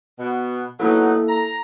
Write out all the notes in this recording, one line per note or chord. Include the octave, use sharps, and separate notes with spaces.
B2 B3
F#3 A#3 B3 D#4 E4 A4
A#5